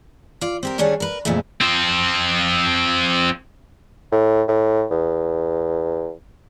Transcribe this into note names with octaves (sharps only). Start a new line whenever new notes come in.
F4 D5
C4 G4 A#4
D#3 G3 C#4 D4 G#4 C#5
A#4 B4
F2 A#2 D3 G#3 A3
F3 C4
A2
A2
E2